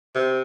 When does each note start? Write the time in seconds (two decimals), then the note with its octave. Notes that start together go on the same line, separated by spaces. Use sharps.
0.15 C3